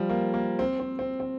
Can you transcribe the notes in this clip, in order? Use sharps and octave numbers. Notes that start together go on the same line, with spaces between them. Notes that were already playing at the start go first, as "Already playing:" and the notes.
Already playing: F3 G3
A#3
A#3
C4
C4
C4
C4